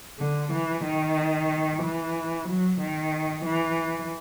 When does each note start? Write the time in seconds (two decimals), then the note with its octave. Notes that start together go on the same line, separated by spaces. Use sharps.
0.19 D3
0.52 E3
0.85 D#3
1.82 E3
2.48 F#3
2.80 D#3
3.45 E3